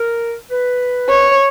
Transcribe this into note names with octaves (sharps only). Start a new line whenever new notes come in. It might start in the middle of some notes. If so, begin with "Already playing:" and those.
Already playing: A#4
B4
C#5